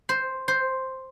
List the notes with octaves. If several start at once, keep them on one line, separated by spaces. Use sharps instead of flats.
C5
C5